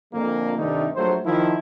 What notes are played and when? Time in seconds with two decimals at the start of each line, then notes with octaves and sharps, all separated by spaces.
0.14 F2 A#2 D3 A3 A#3
0.58 G2 C3 D#3 G3 A3 D#4
0.96 A#1 F#3 A3 C5
1.25 D#3 F3 E4